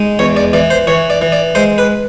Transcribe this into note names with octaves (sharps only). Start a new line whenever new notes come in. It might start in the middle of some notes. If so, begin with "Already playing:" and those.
Already playing: G#3 D#4
E2 C#5
D5
E3 D5
C5
E3 C#5
D5
E3
D5
G#3 C5
B4